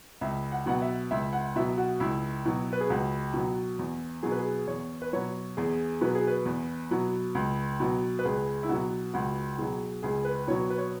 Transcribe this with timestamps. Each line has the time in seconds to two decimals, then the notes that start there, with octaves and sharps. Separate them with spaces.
0.21 C#2 E5
0.52 F#5
0.66 B2 F#3 F#5
0.82 E5
1.11 C#2 E5
1.33 F#5
1.56 B2 F#3 E5
1.78 F#4
2.00 C#2 E4
2.45 B2 F#3
2.73 B4
2.80 G#4
2.90 C#2 F#4
3.33 B2 F#3
3.79 E2
4.23 B2 F#3 G#4
4.32 B4
4.39 G#4
4.67 E2 C#5
5.02 B4
5.13 B2 F#3 C#5
5.57 E2 G#4
6.01 B2 F#3 B4
6.15 G#4
6.27 B4
6.46 E2
6.91 B2 F#3
7.35 C#2
7.80 B2 F#3
8.19 B4
8.25 C#2 G#4
8.63 E4
8.69 B2 F#3 F#4
9.14 C#2 F#4
9.58 B2 F#3 G#4
10.03 C#2 G#4
10.25 B4
10.48 B2 F#3 C#5
10.70 B4
10.78 C#5